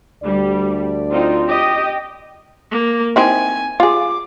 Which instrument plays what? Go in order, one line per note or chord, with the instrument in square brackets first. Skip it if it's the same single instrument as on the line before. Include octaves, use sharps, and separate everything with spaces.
[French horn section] D2 D4 D5 [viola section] G3
[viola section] C4 D#4 F4
G4 D#5 G5
[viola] A#3
[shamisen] C4 D#4 E4 [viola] G#5
[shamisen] F4 G#4 [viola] D6